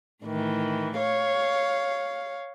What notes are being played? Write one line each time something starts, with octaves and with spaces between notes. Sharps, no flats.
A2 D#3 E3
C#5 F5